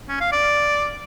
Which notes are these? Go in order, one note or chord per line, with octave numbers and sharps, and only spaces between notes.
C#4
F5
D5